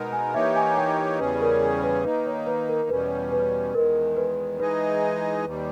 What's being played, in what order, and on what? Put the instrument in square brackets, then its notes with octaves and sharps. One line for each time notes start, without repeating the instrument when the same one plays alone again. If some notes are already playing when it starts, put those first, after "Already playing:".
Already playing: [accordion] B2 G#3 B3 D#4 A#4
[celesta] G#5
[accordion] E3 A#3 D#4 G4 C#5 [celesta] E5
[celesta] G#5
G5
D#5
[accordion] E2 C#3 G3 C#4 G#4 [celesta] B4
[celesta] A#4
B4
[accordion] D#3 A#3 D#4 [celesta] B4
[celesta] C#5
B4
A#4
[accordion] E2 B2 G3 C#4 [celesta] B4
[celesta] B4
[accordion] E2 D#3 G#3 [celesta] A#4
[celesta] B4
[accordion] E3 G#3 D#4 G#4 D#5 [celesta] B4
[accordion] D#2 D#3 G3